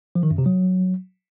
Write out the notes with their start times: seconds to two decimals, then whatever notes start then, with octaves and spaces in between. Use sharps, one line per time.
0.15 F3
0.23 D#3
0.31 F#2
0.38 C3
0.46 F#3